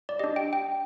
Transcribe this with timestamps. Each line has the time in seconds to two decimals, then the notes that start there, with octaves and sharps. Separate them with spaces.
0.09 D5
0.19 D4 G4 D#5
0.36 G5
0.53 G5